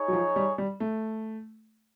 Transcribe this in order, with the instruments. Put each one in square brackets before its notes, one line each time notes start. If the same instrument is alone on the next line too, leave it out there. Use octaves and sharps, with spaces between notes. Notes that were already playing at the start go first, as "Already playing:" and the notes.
Already playing: [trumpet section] D#4 G#4 C#5
[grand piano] F#3
F3
G3
G3
A3